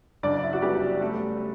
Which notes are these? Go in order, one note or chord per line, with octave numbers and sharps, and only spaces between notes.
F#1 D4 D5
E4
F#4
G3 B3 G4
G3 A3 A4